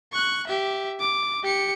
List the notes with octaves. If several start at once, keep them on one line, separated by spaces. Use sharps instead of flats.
C#6 F#6
G4 E5
D6
G4 C#7